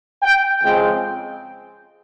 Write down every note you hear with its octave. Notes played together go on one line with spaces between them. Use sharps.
G5
F2 C#3 F3 G#3 C4 G5